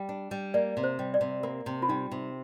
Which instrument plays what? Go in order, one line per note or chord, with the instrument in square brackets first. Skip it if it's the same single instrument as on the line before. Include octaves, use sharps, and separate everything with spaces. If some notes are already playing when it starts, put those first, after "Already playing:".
Already playing: [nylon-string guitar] G3
D4
G3
[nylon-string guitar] A#3 [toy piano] D5
[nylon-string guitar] C3
[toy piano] C5
[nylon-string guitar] G3
[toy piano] D5
[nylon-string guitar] C3
[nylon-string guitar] A#3 [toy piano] A#4
[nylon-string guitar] C3
[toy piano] F4
[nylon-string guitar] G3 [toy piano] D#4
[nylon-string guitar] C3